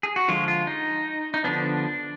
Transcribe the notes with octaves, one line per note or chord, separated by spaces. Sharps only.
G#4
F#4
D3 F3 G#3 F4
F4
D#4
D#4
D3 F3 B3 D4